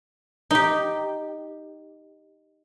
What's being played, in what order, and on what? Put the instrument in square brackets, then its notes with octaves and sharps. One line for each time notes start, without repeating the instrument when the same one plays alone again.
[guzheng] D#4 G4